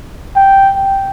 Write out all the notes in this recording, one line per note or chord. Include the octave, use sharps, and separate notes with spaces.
G5